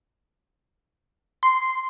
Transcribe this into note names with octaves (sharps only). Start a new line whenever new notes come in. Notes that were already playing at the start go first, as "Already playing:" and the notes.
C6